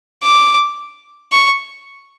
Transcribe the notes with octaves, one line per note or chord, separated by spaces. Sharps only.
D6
C#6